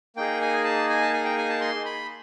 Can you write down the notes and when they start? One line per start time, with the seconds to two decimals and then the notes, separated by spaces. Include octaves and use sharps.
0.16 A#3 D#4 G#4 G5
0.41 G#5
0.64 A5
0.89 G#5
1.02 A5
1.13 G#5
1.24 G5
1.38 G#5
1.49 A5
1.61 C6
1.86 B5